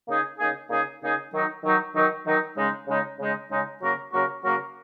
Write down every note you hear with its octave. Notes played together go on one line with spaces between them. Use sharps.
C#3 A#3 D#4 G#4
C#3 A#3 D#4 G#4
C#3 A#3 D#4 G#4
C#3 A#3 D#4 G#4
D#3 F#3 D#4
D#3 F#3 D#4
D#3 F#3 D#4
D#3 F#3 D#4
C#3 G#3 D#4
C#3 G#3 D#4
C#3 G#3 D#4
C#3 G#3 D#4
C#3 F#3 A#3 F#4 A#4
C#3 F#3 A#3 F#4 A#4
C#3 F#3 A#3 F#4 A#4